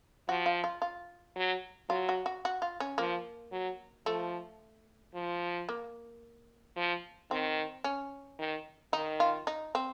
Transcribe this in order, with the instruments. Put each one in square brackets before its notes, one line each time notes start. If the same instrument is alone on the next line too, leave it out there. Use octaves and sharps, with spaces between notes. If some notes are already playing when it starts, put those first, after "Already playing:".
[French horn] F3 [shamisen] F#4
[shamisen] F4
F4
F4
[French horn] F#3
[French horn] F#3 [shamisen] F4
[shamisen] F#4
F#4
F#4
F4
C#4
[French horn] F3 [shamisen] A#3
[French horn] F#3
[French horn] F3 [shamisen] A3
[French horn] F3
[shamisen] A#3
[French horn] F3
[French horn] D#3 [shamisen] C4
[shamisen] C#4
[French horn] D#3
[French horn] D#3 [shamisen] D#4
[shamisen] F4
D#4
C4